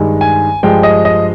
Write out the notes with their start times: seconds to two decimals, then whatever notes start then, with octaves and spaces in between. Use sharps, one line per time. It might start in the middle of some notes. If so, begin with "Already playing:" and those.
Already playing: G2 D#3 G#3
0.21 G#5
0.63 G2 F3 G#3 G5
0.83 D#5
1.05 D#5